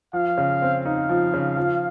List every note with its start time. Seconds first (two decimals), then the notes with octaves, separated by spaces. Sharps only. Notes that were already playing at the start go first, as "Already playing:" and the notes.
0.13 F3 F5
0.38 C#3
0.62 C4
0.85 D#4 F5
1.09 F3
1.34 C#3
1.57 F3